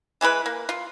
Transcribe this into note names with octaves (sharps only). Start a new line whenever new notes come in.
E3 G#3 E4 B4
A#3
F4